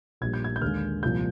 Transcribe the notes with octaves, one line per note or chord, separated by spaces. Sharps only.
A#1 A#2 G3 G#6
G6
G#6
G6
D#2 D3 G#3 F6
C2 A#2 F3 G6